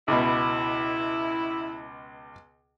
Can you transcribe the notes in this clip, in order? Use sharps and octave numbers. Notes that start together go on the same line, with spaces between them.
C#2 B2 E4